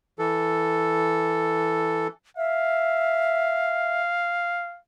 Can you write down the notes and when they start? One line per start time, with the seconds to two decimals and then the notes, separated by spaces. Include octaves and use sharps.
0.19 E3 A4
2.37 E5 F5